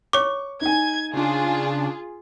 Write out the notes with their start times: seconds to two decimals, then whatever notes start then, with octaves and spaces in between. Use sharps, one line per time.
0.13 C#5 C#6 D6
0.61 D#4 G#5 G#6
1.13 C#3 D4 F4 G#4